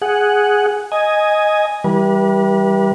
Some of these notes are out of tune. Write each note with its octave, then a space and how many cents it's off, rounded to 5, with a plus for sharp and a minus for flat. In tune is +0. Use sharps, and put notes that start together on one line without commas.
G#4 +0 F#5 +0
D#5 +0 G#5 +0
E3 +0 G3 +0 B4 -40